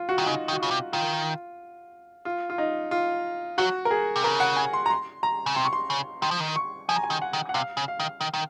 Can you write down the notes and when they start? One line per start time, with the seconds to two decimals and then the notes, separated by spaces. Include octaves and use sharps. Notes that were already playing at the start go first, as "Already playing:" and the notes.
Already playing: F4
0.09 F#4
0.18 D#3 F4
0.26 C#3 D#4
0.48 D#3
0.52 F#4
0.60 C#3 F4
0.71 C3
0.93 D#3 F4
2.25 F4
2.50 F4
2.58 D#4
2.91 F4
3.58 F#3 F#4
3.85 A#4
3.91 G#4
4.16 C3
4.24 C#3 A#4
4.40 F#5
4.57 G#5
4.73 C6
4.86 A#5
4.90 C6
5.23 A#5
5.46 C#3
5.56 C3 C6
5.65 C#6
5.73 C6
5.90 C#3
6.22 D#3 C6
6.31 F3
6.40 D#3
6.56 C#6
6.89 F3 G#5
6.96 A#5
7.04 G#5
7.10 D#3
7.22 F#5
7.33 D#3
7.49 F#5
7.54 C3 F5
7.77 C#3
7.88 F5
8.00 D#3
8.21 D#3
8.34 D#3